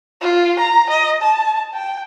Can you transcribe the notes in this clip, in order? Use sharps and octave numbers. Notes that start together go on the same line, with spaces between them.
F4
A#5
D#5
A5
G5